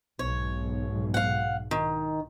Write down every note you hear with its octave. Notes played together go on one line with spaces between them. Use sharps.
B1 G#2 C#5
F5 F#5
D#3